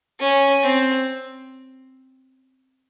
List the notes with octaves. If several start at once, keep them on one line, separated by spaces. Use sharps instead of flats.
C#4
C4